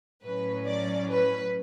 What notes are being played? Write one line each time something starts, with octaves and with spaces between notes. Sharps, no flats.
A2 F#3 C#4 B4
D5
B4